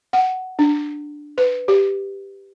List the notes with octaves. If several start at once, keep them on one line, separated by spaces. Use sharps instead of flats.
F#5
D4
B4
G4